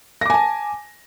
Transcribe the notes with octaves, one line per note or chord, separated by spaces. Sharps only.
G#5 A5 D6 A#6